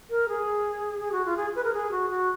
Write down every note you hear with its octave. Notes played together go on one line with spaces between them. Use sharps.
A#4
G#4
G#4
F#4
F4
G#4
B4
A#4
G#4
F#4
F#4